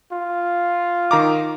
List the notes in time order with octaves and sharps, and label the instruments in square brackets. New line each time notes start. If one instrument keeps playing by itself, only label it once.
[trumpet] F4
[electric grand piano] D#3 A#5 D6